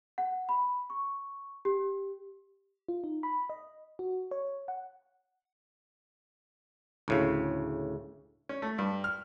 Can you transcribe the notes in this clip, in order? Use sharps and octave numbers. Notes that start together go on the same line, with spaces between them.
F#5
B5
C#6
G4
F4
D#4
B5
D#5
F#4
C#5
F#5
D2 A2 C#3
C#4
A3
G2
F6